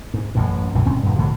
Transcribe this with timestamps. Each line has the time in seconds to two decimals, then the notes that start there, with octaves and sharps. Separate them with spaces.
0.14 G#2
0.35 A1 F#2 A2
0.75 B1 F#2 A2 E3
0.86 D#1 C#2 C4 C#4
1.03 D#1 G2
1.16 B1 A2 D3 F3